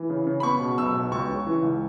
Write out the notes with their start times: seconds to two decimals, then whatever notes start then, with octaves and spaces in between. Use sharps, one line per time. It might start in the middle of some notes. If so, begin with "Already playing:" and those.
Already playing: E3
0.10 C#3
0.27 C#3
0.40 B5
0.43 B3 C#6
0.60 B2
0.77 B1 E6
0.94 B2
1.11 C#2 C#6
1.29 C#3
1.47 E3
1.63 C#2